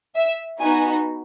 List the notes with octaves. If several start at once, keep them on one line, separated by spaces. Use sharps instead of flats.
E5
B3 D#4 F#4 G#5